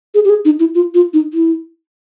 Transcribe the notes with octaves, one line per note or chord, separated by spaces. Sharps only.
G#4
G4
G#4
D#4
E4
F4
F4
D#4
E4